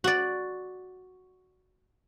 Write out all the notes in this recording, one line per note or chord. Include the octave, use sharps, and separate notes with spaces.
F#4 D5